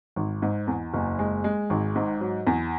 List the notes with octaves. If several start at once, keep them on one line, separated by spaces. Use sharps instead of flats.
G#1
G#2
E2
F#1
G#3
G#3
G#1
G#2
F#3
E2